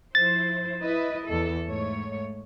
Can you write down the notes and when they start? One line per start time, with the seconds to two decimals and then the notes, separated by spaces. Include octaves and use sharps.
0.15 F3 E4 C5 A6
0.82 E4 B4 D#5
1.27 E2 A4
1.66 G#2 A3 C#5